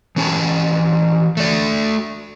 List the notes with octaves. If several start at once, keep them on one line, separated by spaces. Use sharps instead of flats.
E3 C#4 G4 A5
A3 D5